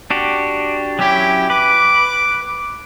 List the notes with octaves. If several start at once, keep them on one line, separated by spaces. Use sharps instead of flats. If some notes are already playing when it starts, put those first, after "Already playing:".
D4 F#4 G4
F#3 C#4 E4 G4
B4 D6